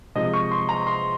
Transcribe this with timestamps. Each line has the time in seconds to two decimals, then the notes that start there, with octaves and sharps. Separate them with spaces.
0.15 C3 F3 G#3 D#5
0.34 C#6
0.51 C6
0.69 A#5
0.87 C6